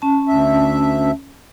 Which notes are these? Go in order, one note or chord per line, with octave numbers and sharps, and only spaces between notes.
C#4 A5
D2 E5